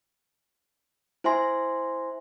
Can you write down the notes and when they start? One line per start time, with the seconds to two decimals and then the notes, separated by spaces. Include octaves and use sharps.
1.24 E4 C5 E5 G#5 C6 A#6